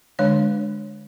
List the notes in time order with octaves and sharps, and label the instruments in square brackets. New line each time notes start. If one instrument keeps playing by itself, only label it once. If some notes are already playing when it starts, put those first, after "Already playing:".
[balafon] D3 G#3 D4 C#5